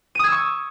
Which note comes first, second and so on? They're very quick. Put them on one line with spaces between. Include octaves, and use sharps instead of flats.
D#7 D#6 G#6 E6 C#6